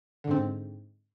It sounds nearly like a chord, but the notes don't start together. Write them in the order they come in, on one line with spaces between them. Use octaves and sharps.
D3 G#2 C4